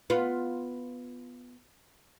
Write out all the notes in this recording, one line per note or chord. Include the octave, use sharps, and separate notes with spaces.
B3 F4